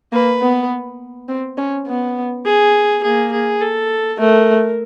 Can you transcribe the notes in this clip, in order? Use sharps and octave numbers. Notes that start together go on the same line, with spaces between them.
A#3 B4
B3
C4
C#4
B3
G#4
A#3 G#4
G#4
A4
A3 A#4